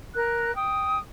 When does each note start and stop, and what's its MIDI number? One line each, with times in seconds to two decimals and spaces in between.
0.14 0.54 70
0.14 0.54 90
0.55 0.98 79
0.55 0.98 87